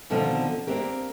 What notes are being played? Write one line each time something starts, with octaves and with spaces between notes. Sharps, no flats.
B2 D3 D#3 F3 C4
A#3 C4 D4 G4 A#4